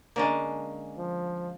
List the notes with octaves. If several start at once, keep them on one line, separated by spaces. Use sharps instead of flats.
D3 G#3 A#3 C#4
F3